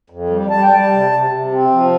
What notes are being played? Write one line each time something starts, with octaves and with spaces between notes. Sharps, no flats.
F2
G3
G3 A5
G5
G3 A5
C3
C3
C3
C4
F3